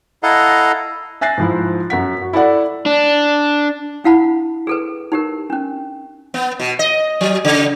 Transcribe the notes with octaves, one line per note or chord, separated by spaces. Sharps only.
E4 A4 D#5 F5 F#5 A#5
E5 G#5 F#6 A6 A#6 C7
G#2 F3 E4
F#2 F#5 B6
F#4
E4 A4 D5 F#5
D4
D4 E4 F5 F#5 A5 B5
G#4 A4 B4
D#4 G4 A#4
C#4 D4
B3
B2
D#5
F#3
C#3